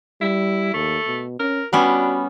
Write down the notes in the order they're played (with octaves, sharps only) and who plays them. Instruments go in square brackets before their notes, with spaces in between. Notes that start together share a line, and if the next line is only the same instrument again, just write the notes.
[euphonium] G3 [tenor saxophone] E4
[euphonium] D#2 [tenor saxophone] A3
[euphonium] B2
[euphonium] C#4 [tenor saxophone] A#4
[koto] G3 B3 C#4 [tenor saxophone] D4 [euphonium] F#4